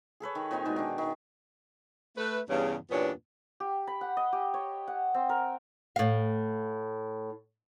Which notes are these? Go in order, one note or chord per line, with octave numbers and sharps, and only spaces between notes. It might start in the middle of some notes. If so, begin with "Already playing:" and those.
G#4 A4 B4 C#5
D#3
A#2 C4 D#4 G#5
B2 D#3 G#3
D#3 D4
D#3
A3 B4
E2 G2 C#3
E2 G2 A#2 B3 C#4 D4
G4
B5
F#5
D#5
G4
C#5
F#5
C4
A#4
A2 F5